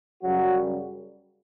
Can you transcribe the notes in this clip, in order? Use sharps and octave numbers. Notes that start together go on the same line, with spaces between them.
F#2 C#3 F#3 G3 F#4